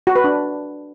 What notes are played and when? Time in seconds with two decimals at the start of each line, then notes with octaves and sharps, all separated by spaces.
0.07 F#4
0.16 B4
0.24 D4